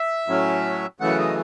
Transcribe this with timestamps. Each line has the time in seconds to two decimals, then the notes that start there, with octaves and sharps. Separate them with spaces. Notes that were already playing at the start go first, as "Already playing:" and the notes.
Already playing: E5
0.27 A2 F#3 C#4
1.00 F#2 C#3 E3 A3 F#5
1.19 D#5